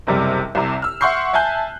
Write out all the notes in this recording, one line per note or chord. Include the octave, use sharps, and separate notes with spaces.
F#1 C3 G3
C2 C3
E6 F6
E5 F#5 C6 C#6 G6 C7
E5 G#5 A5 F#6 G6